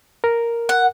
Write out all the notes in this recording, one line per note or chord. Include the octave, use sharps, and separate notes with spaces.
A#4
F#5